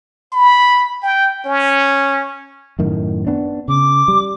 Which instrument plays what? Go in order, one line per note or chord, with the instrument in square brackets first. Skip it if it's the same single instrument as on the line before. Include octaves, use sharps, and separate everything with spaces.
[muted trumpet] B5
G5
C#4
[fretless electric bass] F#2 A2 D#3
B3 D4
[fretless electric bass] C#3 [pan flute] D6
[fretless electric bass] G3